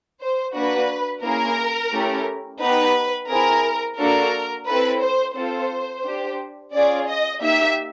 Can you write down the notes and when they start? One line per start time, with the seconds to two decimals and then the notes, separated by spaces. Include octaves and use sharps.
0.21 C5
0.55 A#3 D4 F#4 B4
1.24 A#3 C#4 E4 G#4 A#4
1.93 A3 C#4 E4 G4
2.61 B3 D#4 G4 B4
3.30 C4 E4 G#4 A#4
3.99 A#3 D4 F#4 A4 A#4
4.67 C4 E4 A4 B4
5.01 C5
5.36 C4 F4 A4 C5
6.05 D4 G4
6.73 C#4 F4 G#4 D5
7.08 D#5
7.41 A#3 D#4 G4 E5